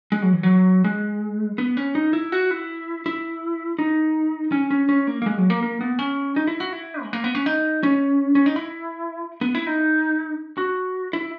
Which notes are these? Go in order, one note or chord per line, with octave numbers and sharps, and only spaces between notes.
G#3
F#3
E3
F#3
G#3
B3
C#4
D#4
E4
F#4
E4
E4
D#4
C#4
C#4
C#4
A#3
A#3
G#3
F#3
A#3
A#3
B3
C#4
D#4
E4
F#4
E4
G#3
A#3
B3
C#4
D#4
C#4
C#4
D#4
E4
B3
E4
D#4
F#4
E4